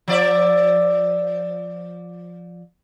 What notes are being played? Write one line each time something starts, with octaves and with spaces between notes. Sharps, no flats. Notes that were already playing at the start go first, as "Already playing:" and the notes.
F3 D5 E5